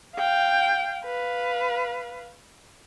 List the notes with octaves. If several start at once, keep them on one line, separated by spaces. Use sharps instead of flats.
F5 G5
B4 F5